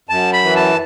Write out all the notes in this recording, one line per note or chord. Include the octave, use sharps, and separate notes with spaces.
F#2 A5
B5
E3
A5